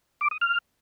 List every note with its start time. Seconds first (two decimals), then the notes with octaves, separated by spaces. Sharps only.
0.21 D6
0.31 D#6
0.41 F6